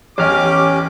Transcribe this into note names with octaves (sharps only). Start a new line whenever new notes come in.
A1 E2 C#4 G4 C#5 D#5 D6 F6